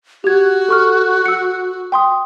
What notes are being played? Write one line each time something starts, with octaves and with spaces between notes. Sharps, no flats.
F#4 G4 G#6
A4 C#6 F6
E6 C#7
G5 C6 D#6